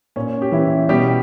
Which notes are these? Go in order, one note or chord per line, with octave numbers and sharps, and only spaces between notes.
A#2 C#4
G4
E3 E4
B2 G3 G4